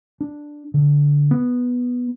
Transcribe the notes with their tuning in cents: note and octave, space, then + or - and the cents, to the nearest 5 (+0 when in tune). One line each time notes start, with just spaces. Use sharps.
D4 +5
D3 -15
B3 -5